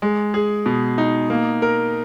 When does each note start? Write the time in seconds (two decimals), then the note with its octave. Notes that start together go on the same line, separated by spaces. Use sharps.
0.02 G#3
0.34 G#4
0.66 B2
0.98 D#4
1.30 A#3
1.62 A#4